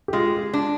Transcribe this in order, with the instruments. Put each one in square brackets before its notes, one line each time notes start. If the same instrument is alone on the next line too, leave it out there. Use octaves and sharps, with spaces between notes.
[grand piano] G4
[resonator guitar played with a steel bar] G#3 [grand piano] F4
[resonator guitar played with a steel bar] D4